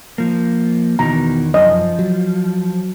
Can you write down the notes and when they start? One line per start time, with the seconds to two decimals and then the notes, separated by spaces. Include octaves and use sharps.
0.18 F3 A#3
0.99 E2 B2 D#3 E3 A#5
1.54 F1 F#2 F3 D#5
1.99 F#3